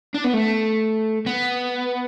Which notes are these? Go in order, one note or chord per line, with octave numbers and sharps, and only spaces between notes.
D4
B3
A3
B3